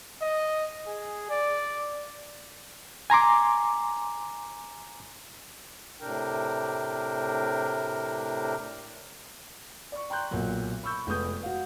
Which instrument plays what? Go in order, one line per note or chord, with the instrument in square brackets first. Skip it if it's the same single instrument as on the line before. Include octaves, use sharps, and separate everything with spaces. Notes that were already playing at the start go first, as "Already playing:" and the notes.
[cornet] D#5
G#4
D5
[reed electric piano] G#5 A#5 C6 D6
[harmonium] A2 C3 D4 A#4 G5
[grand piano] D5 C#6
G5 A#5 C6 F#6 G6
B1 A#2 F#3
B5 C#6 E6 G6
F1 G#3 B3 D#6 G6
F#4 F5